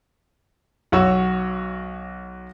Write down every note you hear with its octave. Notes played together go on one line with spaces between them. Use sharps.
B1 F#4 C#5 E6